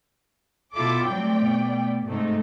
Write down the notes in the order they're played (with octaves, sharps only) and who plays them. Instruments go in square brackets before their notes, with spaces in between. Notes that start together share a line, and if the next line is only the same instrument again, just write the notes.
[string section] B2 D6 [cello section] E4 F4 A4
[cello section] F#3 G3 C4 [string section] A3 D5 G5
[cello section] B2
[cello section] G#2 C3 [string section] A3 D#4